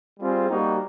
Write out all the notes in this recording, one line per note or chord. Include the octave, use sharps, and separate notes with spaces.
G3 C4 F4 G#4 C5
G3 A#3 D#4 F#4